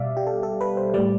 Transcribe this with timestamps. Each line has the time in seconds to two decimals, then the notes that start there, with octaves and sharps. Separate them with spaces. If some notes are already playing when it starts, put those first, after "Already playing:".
Already playing: B2 G3 D5 E5 F5
0.17 G4
0.27 A4
0.43 A4
0.61 B4
0.77 C5
0.94 A2 G3 D5